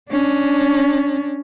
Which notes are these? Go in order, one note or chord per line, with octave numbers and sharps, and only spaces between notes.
C#4 D4